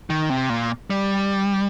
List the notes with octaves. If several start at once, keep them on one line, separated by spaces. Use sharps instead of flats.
D#3
C3
A#2
G3